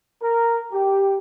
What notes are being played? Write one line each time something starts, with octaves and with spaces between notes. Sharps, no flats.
A#4
G4